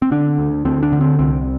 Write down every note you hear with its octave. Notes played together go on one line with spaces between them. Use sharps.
C4
D3 D4
D2
D2 C4
D4
D3
C4
C2 C4